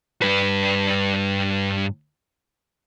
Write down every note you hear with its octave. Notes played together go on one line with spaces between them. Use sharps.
G2 B4